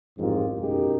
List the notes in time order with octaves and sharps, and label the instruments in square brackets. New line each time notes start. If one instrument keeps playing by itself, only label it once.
[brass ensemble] A1 F2 G#2 F4 G4 A#4
B1 F#2 G#3 D#4 G4 A#4